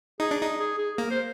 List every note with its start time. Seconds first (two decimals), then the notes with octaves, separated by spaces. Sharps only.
0.20 D#4 G#4
0.31 D4
0.42 D#4
0.60 G#4
0.78 G#4
0.98 A#3 A#4
1.11 C5